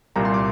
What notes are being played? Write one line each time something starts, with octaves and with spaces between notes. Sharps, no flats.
C2 A#2 G3 A#3 A#5
C6
D6